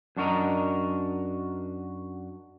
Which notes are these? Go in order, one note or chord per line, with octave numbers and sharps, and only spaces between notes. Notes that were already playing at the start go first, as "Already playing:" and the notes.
F#2 D4 F#4 A#4 D#5 A#5